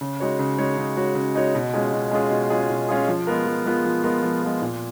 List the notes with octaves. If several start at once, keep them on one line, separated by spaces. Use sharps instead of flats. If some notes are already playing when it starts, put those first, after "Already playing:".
C#3
G#3 D#4 F#4 C#5
C#3
G#3 D#4 F#4 C#5
C#3
G#3 D#4 F#4 C#5
C#3
G#3 D#4 F#4 C#5
B2
G#3 C#4 F4 G#4
B2
G#3 C#4 F4 G#4
B2
G#3 C#4 F4 G#4
B2
G#3 C#4 F4 G#4
F3
G#3 B3 F4 A#4
F3
G#3 B3 F4 A#4
F3
G#3 B3 F4 A#4
F3
G#3 B3 F4 A#4
A#2